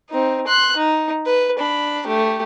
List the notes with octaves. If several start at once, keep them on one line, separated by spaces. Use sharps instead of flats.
C4 D#4
C6 F#6
D#4
B4
D4 B5
A3 G4